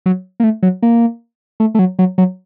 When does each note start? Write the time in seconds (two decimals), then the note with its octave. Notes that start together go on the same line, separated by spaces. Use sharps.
0.06 F#3
0.40 A#3
0.44 A3
0.63 F#3
0.83 A#3
1.60 A3
1.75 A3
1.79 F#3
1.99 F#3
2.18 F#3